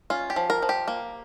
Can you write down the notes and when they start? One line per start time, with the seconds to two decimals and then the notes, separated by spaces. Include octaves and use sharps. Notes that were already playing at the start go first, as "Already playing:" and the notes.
0.10 C#4 F4
0.30 G4
0.36 F3
0.50 A#4
0.62 F3
0.69 G4
0.88 A#3